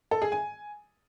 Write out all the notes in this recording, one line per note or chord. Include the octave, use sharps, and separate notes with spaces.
A4
G#4
G#5